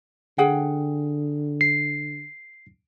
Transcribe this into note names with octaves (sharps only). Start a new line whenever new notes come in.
D3 G#4 F#5 G5
C7